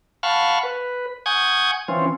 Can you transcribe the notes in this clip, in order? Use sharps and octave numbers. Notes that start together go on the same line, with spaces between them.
F5 F#5 A5 B5 C#6 F6
B4
F#5 G#5 C#6 D#6 G6 G#6
E3 C4 C#4 F4